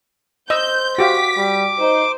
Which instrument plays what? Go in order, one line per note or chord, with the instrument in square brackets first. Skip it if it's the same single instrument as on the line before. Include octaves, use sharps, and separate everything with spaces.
[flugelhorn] C5 [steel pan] D#5 E6 [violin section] G6
[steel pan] F#4 G4 F5 [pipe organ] D6 [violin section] B6
[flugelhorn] G3
[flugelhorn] D#4 [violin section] C5